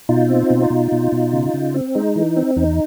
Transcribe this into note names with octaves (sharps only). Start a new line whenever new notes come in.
B2 D#4 F4
C4
B2
B2
B2
B2
C#3
C#3
C4
G#3 D#4
E3
C4
E2 D#4